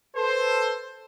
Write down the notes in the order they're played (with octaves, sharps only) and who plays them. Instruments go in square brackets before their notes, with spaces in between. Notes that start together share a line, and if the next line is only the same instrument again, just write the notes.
[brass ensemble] A4 B4 C5